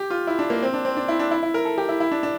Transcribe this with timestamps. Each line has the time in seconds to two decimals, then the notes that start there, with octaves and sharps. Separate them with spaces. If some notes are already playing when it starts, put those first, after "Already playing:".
Already playing: G4
0.10 F4
0.27 E4
0.39 D4
0.50 A#3
0.63 C4
0.74 D4
0.85 C4
0.97 D4
1.08 E4
1.19 D4
1.31 E4
1.43 E4
1.54 A#4
1.65 A4
1.78 G4
1.89 E4
2.00 E4
2.11 D4
2.23 D4